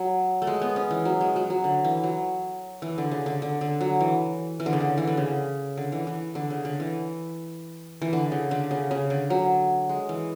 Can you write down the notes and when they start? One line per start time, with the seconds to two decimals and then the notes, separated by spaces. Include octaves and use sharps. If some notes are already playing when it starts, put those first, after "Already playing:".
Already playing: F#3
0.42 A3
0.47 G#3
0.61 B3
0.76 C#4
0.90 E3
1.05 F#3
1.21 G#3
1.36 F#3
1.50 F#3
1.64 D3
1.84 E3
2.03 F#3
2.82 E3
2.98 D3
3.11 C#3
3.26 D3
3.42 D3
3.61 D3
3.81 F#3
4.00 E3
4.60 E3
4.66 D3
4.73 C#3
4.80 D3
4.98 E3
5.07 D3
5.17 C#3
5.77 D3
5.92 E3
6.07 E3
6.35 D3
6.50 C#3
6.65 D3
6.80 E3
8.02 E3
8.13 D3
8.32 C#3
8.51 D3
8.71 C#3
8.91 C#3
9.10 D3
9.30 F#3
9.89 G#3
10.09 E3